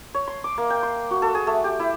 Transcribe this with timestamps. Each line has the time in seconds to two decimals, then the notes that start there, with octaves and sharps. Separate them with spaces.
0.14 C#5
0.28 C6
0.44 D6
0.58 A#3
0.70 G5
0.83 C6
1.11 F#4
1.22 A4
1.35 G#4
1.47 A3
1.64 G4
1.80 E4